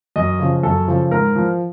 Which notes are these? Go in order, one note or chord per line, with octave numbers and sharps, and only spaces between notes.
F#2 D#5
C#3 F3
F#2 A4
C#3 F3
G#2 A#4
F3